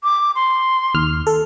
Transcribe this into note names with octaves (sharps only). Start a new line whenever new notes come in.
D6
C6
D#2 F6
A4